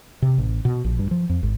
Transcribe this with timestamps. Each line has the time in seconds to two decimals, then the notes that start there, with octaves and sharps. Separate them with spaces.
0.22 C3
0.38 A1
0.65 B2
0.84 A#1
0.99 G2
1.11 F3
1.29 F2
1.43 G#1